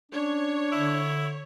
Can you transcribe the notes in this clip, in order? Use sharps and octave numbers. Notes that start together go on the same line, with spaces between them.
C#4 D4 C#5
D3 E4